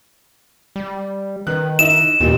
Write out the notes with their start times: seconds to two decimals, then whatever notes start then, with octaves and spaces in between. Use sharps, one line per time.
0.76 G3
1.47 D#3 B4 F#6
1.79 D#4 E4 D#5 E7
2.20 A1 D#2 A#2 G4